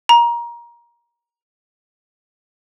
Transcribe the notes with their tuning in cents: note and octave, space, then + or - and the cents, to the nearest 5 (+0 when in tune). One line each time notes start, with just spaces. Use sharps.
A#5 +20